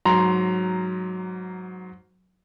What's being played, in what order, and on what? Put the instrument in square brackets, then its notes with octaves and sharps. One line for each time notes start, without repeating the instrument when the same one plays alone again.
[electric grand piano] G#2 F#3 A#5 C6